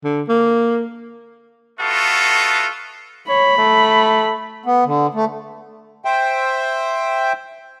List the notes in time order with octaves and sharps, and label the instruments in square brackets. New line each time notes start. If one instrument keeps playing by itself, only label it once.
[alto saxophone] D3
A#3
[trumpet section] A3 B3 F4 F#4 A4
[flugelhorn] C#5 [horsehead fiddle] B5
[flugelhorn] A3
[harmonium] B3
D3
A3
[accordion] C5 E5 G5